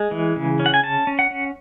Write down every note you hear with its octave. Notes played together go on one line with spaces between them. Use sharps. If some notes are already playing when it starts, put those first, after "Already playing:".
Already playing: G#3
E3
C#3
C#4
F#5
G#5
C#4 A5
C#4
F#5
C#4